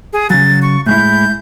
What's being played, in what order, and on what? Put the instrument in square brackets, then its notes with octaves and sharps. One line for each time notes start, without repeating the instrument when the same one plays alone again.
[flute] G#4
[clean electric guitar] C#3 F#3 [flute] A6
[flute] C#6
[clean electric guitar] A2 G#3 E4 [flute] G6